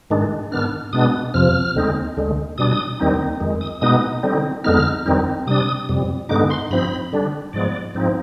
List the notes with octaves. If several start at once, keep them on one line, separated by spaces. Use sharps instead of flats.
G#2 D#3 G#3 D4
G#2 D#3 B3 D4 F6
B2 G#3 B3 D4 D#6
F2 C3 F3 F6
D#2 D3 G#3 C4 D#4
D2 D3 G#3
B2 G3 D4 D#6
D#2 D#3 G3 C4 D#4
F2 D#3 G#3
D#6
B2 G#3 B3 D#4 D#6
D3 G3 C4 D#4
F2 D3 G#3 B3 D#4 F6
F2 D#3 G3 C4 D#4
C3 G3 D4 D#6
F2 C3 G3
G2 D3 G#3 B3 D#4 D6
C6
G2 F3 C4 D#4 B5
D3 G3 D4
G#2 F3 G#3 B3 D5
G#2 F3 C4 D#4